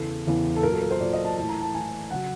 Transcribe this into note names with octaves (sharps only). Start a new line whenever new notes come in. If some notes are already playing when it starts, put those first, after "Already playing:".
Already playing: E2 C#3 E3 A4
E2 C#3 E3
A4
A#2 F#3 A#4
A4
A#4
C5
A#2 F#3 D5
D#5
A5
A2 E3 A5
A#5
A5
A2 E3 G#5
C#3 F#3 F#5